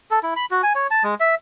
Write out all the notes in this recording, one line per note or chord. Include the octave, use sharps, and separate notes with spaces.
A4
E4
B5
F#4
G#5
C#5
A5
G#3
E5